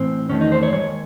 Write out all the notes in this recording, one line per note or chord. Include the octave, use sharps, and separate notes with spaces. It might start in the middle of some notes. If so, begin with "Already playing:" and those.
Already playing: A2 E3 C4
E2 D#3 A3 C#4
D#4
C5
C#5
D#2 C#3 G#3 C#5